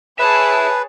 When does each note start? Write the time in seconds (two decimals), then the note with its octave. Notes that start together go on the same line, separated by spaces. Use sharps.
0.19 G#4 B4 C#5 E5 A5 B5